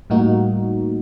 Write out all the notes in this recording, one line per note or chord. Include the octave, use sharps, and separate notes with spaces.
A2 G3 A#3 D#4 F#4